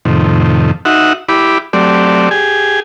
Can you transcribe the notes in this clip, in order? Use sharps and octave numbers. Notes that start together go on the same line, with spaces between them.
F2 A2 C3 D#3
D#4 F#4 E5 F#5
E4 G4 B5 D6
F#3 A3 C4 G4 D5
G4 G#4 G#5